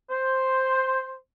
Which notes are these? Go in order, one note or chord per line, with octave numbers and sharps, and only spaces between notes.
C5